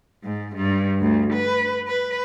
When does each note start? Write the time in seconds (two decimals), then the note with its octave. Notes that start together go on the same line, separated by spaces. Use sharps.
0.24 G#2
0.56 G2
1.01 D2
1.34 B4
1.87 B4